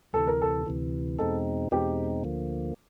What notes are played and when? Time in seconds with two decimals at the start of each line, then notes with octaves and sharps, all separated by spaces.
0.13 D2 C3 E3 A4
0.27 A#4
0.42 A4
0.66 D2 C3 E3
1.18 E2 B2 G#3 C4 D#4 A4
1.71 E2 B2 G#3 C4 D#4 G4
2.24 D2 D3 F3 A#3